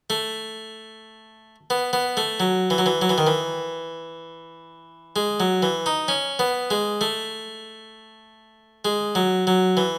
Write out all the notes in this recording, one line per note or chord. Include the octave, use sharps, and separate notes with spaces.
A3
B3
B3
A3
F#3
E3
F#3
E3
F#3
E3
D#3
E3
G#3
F#3
E3
D#4
C#4
B3
G#3
A3
G#3
F#3
F#3
E3